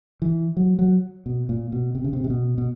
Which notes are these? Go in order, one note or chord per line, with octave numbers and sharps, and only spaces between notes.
E3
F#3
F#3
B2
A#2
B2
C3
C#3
C3
C3
B2
B2